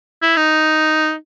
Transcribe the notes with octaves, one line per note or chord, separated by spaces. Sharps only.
E4
D#4